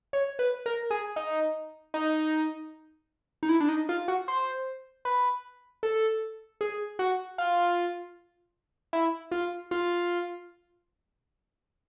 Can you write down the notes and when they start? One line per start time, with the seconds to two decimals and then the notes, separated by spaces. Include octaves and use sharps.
0.13 C#5
0.39 B4
0.66 A#4
0.91 G#4
1.16 D#4
1.94 D#4
3.43 D#4
3.49 E4
3.60 D4
3.69 D#4
3.89 F4
4.08 F#4
4.28 C5
5.05 B4
5.83 A4
6.61 G#4
6.99 F#4
7.38 F4
8.93 E4
9.31 F4
9.71 F4